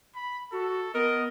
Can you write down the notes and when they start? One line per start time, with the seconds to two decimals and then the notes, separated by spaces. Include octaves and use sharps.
0.15 B5
0.52 F#4 A4
0.94 B3 A#4 D#5